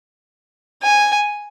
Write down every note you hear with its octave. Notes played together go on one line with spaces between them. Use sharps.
G#5